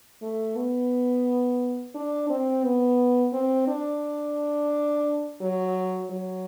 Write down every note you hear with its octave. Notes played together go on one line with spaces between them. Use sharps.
A3
B3
D4
C4
B3
C4
D4
F#3
F#3